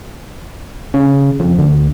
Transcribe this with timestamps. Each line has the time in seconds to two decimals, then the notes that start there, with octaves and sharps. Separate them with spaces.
0.94 C#3
1.40 F2
1.59 D2